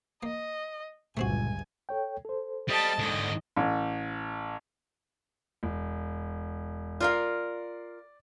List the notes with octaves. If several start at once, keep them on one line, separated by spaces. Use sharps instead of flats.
A#3 D#5
G1 C#2 A#2 A3 C4 F#4 G#5
A4 C#5 G5
A4 C5
G3 D#5 A5
G#2 D3 D#5
A1
E1
F4 A#4 D5 F5